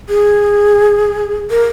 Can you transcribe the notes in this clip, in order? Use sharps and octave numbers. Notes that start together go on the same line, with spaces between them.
G#4
A#4